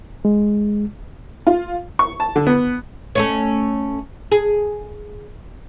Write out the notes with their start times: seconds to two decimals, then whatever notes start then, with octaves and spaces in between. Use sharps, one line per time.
0.25 G#3
1.47 F4
1.99 C#6
2.20 A5
2.36 D3
2.47 B3
3.15 A3 C#4 C#5
4.32 G#4